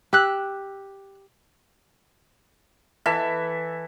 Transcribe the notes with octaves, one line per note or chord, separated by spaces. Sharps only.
G4 E6 F#6
E3 A4 E5